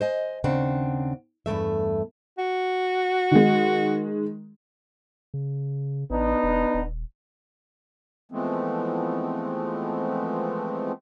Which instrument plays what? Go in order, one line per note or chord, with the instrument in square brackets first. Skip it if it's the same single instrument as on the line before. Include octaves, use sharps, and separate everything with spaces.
[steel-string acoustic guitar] C5 D#5 G#5
D#2 C#3 C4 D4 F#5
E2 G2 D#3 A3 E5
[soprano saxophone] F#4
[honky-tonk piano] D#3 G#3
[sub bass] C#3
[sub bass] A1 [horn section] B3 D4 D#4
[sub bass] E1
D#1
[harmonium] E3 F3 G#3 A3 B3 C4